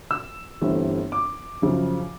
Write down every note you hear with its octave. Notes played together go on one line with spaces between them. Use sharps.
E6
G1 G2 E3 A3 C4
D6
F#2 C#3 F3